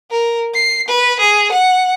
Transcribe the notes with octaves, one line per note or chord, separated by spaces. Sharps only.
A#4
C7
B4
G#4
F#5